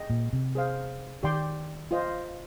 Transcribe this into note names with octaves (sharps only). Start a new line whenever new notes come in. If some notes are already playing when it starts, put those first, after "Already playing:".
Already playing: G#4 D#5 G5
A#2
C3
G#4 C5 F5
D#3 G4 D5 G5 C6
F4 C5 D#5